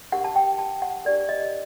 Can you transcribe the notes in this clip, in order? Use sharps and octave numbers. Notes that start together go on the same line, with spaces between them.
D4 G4 A#4 F#5
A5
G5
A5
F#5
D4 G4 A#4 D5
D#5